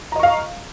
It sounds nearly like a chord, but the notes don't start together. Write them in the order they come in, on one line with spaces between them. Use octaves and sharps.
A#5 D#5 C#6 F5